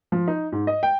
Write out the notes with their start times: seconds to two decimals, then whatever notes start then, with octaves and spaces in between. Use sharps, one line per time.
0.12 F3
0.28 D#4
0.52 G#2
0.67 D#5
0.83 G5